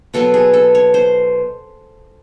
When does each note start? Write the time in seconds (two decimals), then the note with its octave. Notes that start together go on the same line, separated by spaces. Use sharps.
0.14 B2 F#3 B3 A4
0.34 G#4
0.54 A4
0.75 C#5
0.94 C5